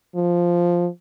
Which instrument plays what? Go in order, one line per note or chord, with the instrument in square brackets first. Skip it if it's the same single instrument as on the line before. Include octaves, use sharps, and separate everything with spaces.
[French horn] F3